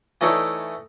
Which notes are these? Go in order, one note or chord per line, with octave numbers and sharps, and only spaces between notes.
E3 A3 D#4 A4 C#5 D5